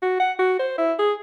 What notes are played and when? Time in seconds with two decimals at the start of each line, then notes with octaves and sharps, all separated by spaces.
0.02 F#4
0.20 F#5
0.39 F#4
0.60 C5
0.78 E4
0.99 G#4